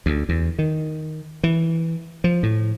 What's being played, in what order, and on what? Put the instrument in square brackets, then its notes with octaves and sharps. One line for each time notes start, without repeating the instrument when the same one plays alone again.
[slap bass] D2
E2
D#3
E3
F3
A2